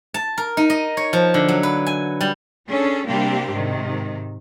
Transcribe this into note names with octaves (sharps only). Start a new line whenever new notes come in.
A5
A#4
D#4
D#5
C#5
F3
D3
F#3
B4
G#5
G3
C#4 D4 G#4 A4
C3 G3 A#3 C4 D4 G4
G#2 C3 D#3